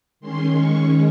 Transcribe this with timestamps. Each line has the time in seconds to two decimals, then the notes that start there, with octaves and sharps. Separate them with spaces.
0.20 D#3 G#3 C#4 C6
0.53 C#6